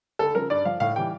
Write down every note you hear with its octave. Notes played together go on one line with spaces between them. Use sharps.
D2 A4
C#3 F3 A#4
G2 D5
F3 F5
A2 F5
E3 G3 G5